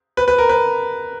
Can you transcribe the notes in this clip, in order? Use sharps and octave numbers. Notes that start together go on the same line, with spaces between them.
B4
B4
A#4
B4